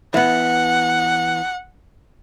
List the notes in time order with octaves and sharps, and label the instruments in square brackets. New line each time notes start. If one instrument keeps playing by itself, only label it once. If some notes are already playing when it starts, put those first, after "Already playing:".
[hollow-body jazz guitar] E3 B3 [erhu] F#5